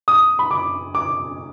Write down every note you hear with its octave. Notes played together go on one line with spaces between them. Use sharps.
D#6
B5
D6
D6